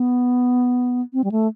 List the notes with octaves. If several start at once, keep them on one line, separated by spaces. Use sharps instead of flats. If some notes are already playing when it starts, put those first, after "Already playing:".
Already playing: B3
C4
G3
A3